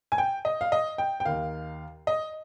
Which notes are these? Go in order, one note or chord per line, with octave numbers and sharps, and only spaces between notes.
G#5
G5
D#5
F5
D#5
G5
G5
D#2 D#3 F5
D#5